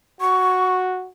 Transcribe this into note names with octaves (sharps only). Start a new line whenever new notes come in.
F#4 C#6